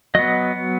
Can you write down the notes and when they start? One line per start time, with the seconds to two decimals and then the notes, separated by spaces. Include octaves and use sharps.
0.15 F#3 B3 D#5